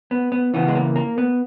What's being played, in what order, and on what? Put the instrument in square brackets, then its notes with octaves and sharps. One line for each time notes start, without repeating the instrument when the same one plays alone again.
[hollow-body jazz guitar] B3
B3
C#3 E3 B3
G#3
A#3
A#3
B3